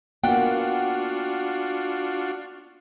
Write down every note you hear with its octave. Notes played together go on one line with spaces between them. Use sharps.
A#3 B3 D4 F4 F#4 F#5 G5